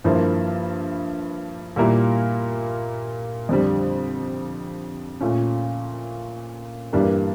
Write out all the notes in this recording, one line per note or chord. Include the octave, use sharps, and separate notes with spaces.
G2 F3 A#3 E4
A#2 G3 A#3 E4 A#4
F2 D3 G3
A#2 A3 C#4 F4
G2 E3 G3 A#3 D4